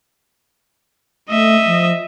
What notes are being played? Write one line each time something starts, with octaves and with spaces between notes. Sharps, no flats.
A3 D#5 E5
F3